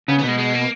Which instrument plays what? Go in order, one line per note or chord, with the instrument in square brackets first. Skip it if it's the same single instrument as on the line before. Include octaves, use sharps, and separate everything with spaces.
[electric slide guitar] C#3 [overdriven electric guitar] B3
[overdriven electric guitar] B3
[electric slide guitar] B2 [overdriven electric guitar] G#3
[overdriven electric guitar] G#3
A#3